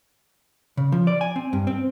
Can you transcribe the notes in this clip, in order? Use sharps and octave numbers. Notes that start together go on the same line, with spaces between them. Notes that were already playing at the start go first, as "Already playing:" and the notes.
C#3
F3
D5
G#5
C4
G2
C4